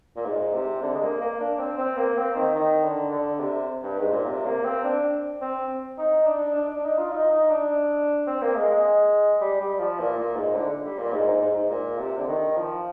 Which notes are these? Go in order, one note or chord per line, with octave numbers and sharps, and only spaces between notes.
A#2
G#2
C3
D3
G#3
A#3
A#3
D4
C4
C4
A#3
C4
D#3
D#3
D3
D3
C3
G2
G#2
A#2
C3
A#3
C4
D4
C4
D#4
D4
D4
D4
D#4
F4
D#4
D#4
D4
C4
A#3
G#3
G#3
G3
G3
F3
A#2
A#2
G#2
D3
G3
A#2
G#2
G#2
G#2
G#2
A#2
C3
D3
D#3
F3